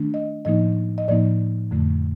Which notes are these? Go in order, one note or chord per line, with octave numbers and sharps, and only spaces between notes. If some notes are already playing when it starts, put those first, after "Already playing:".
Already playing: D#3 A3 D4
D#5
A2 F3 A#3 D#4 D#5
D#5
A2 F3 A#3 D#4 D5
F2 D3 A3